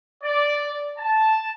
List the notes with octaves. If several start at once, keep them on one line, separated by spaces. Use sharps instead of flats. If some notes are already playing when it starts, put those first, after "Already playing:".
D5
A5